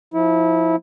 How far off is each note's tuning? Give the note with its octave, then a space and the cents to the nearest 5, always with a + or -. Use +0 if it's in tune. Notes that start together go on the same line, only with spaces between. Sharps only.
F3 +0 E4 -25